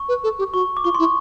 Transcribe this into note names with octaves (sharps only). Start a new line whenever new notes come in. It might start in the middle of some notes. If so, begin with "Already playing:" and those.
Already playing: C#6
B4
A4
G4
F#4 C#6
D6
F4 C#6
C6
E4
C#6